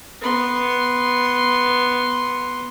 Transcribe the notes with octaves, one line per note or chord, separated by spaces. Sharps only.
B3 C6